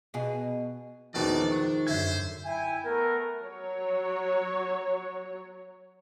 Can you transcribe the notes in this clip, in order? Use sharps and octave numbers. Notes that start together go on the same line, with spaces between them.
B2 G#4
A#1 E2 B2 D#3 F3 G#3 D5
D4 C#6
F#2 D3 C5 E5 G#6
E4 E5 G5 G#5
A3 B3 A#4
F#3 C#5